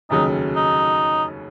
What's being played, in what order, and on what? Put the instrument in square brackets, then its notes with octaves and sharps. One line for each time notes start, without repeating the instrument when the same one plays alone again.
[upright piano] F1 D#2 C#3 F#3 [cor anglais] D#4
[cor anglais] D#4